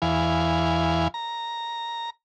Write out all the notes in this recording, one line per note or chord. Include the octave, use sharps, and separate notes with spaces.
E2 E3 F5 G#5
A#5